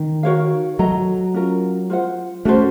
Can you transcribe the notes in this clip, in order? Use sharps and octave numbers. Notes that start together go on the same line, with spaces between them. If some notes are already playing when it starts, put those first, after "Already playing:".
Already playing: D#3
F#4 A#4 C#5 F5
F#3 A4 D#5 A#5
C#4 F4 A#4
F4 C5 F#5
A3 C#4 F#4 A4 C5